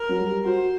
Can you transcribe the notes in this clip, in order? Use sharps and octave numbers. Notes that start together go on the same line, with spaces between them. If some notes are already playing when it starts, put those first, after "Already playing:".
Already playing: A#4
F#3
G3
F#4 C5